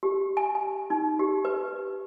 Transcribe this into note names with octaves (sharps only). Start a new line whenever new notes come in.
G4
G#5
G#5
D#4
G4
B4